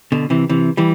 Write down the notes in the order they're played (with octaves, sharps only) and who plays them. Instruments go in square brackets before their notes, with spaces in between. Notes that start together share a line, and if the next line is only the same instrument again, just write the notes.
[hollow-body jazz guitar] B2 D3
C3 E3
C3 E3
E3 G3